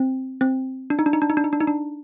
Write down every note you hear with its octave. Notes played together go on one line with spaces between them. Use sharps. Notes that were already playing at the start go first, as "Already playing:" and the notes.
Already playing: C4
C4
D4
D#4
D4
D#4
D4
D#4
D4
D#4
D4
D#4
D4